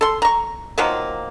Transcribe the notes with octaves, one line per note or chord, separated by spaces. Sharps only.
A4 C6
A#5 C#6
D#3 F3 F#3 A#3